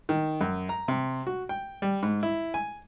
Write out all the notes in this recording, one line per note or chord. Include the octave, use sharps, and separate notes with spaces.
D#3
F#2
A#5
C3
F#4
G5
G3
G#2
E4
G#5